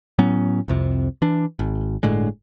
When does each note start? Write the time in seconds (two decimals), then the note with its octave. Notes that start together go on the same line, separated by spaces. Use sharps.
0.18 A2 F#3 B3 C#4
0.68 C2 F2 C3
1.22 E3 D4
1.59 G#1
2.03 G1 A2 D3 G#3